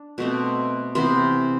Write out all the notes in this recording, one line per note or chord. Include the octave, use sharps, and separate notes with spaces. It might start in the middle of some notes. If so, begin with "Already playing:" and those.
Already playing: D4
B2 A3 C4
C3 E3 B3 C5